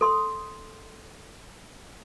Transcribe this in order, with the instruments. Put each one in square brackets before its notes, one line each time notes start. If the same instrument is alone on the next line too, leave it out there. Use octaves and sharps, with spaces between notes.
[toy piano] A4 C6 D#6